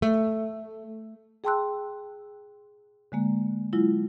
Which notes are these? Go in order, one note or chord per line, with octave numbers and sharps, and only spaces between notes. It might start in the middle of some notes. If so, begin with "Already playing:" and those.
A3
G#4 G5 A5 C6 E6 F#6
D3 G#3 A#3
F#3 G#3 E4 F4